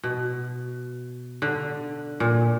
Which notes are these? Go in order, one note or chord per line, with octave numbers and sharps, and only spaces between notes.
B2
D3
A#2